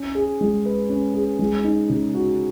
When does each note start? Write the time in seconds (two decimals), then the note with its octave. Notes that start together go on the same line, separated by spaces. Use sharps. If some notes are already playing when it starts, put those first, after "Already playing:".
Already playing: C#4
0.15 G#4
0.41 G#3
0.66 B4
0.89 C#4
1.14 G#4
1.39 G#3
1.64 D#4
1.90 C#3
2.14 F#4